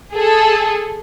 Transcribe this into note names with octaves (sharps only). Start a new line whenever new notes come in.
G#4 A4